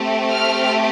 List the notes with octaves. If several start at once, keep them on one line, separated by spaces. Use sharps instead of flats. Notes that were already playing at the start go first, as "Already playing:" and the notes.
Already playing: A3 C4 G4
F6